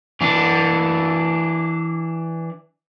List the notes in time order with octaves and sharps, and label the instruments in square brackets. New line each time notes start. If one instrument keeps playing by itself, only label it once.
[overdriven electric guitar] E3 D4